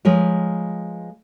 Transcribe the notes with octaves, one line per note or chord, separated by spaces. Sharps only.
F3 G#3 A#4 B4 C#5